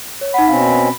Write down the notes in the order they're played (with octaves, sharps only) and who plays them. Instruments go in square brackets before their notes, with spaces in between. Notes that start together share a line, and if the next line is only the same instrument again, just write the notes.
[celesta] C#5
[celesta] D#4 F#5 [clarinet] B5
[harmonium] B2 C4 C#4 [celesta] F5